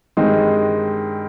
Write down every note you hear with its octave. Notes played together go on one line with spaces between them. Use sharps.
G2 D#3 G#3 C4 D#4